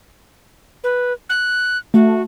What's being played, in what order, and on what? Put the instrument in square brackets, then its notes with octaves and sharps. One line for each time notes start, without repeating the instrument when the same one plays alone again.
[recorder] B4
F#6
[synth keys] A3 [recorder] F#4